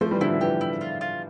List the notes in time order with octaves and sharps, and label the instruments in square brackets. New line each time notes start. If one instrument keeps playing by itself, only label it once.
[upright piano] F3 A3 [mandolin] C5
[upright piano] E3 G3
[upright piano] D3 F3 [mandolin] E4
[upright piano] D3
[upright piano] E3 [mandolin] G4
[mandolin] E4
F4
F4